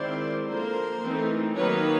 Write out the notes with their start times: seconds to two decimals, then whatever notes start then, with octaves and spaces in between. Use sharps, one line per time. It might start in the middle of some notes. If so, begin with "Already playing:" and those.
Already playing: D#3 G#3 C4 E4 C5 D5
0.46 D3 F3 A#3 A#4 C5
1.01 E3 A3 C4 D#4
1.56 D#3 F#3 A#3 D#4 B4 C#5